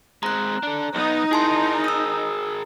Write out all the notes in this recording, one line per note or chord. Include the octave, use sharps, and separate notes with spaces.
G#3 C4 A#5 F#6
D4 A4
B1 B3 D#4
E4 G#4 A#4 A5 C6
D#6 E6